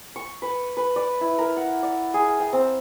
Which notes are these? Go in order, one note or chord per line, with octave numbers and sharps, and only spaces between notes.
C#6
B4
B4
D5
E4
A#4
F#5
D5
G#4
G5
C4